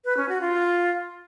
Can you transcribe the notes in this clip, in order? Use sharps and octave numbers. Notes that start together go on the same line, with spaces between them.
B4
C#4
F#4
F4